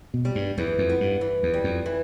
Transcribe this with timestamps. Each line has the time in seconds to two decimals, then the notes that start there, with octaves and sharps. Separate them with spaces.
0.14 B2
0.25 G3
0.35 G2
0.58 E2 E3
0.78 F2
0.89 B3
1.00 G2
1.21 E3
1.43 E2
1.54 G3
1.64 F2
1.86 E3